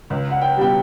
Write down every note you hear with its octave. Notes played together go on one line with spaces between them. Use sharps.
C#2
F#5
G5
B2 G3 G5